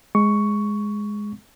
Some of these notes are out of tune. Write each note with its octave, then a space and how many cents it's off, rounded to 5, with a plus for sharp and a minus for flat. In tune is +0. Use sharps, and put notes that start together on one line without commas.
G#3 +0 C#6 +10